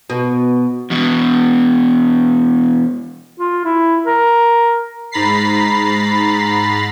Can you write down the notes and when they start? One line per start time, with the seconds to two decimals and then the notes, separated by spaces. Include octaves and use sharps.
0.10 B2
0.90 E2 B2
3.39 F4
3.65 E4
4.06 A#4
5.11 G#2 A#5 B5 A6 B6 C7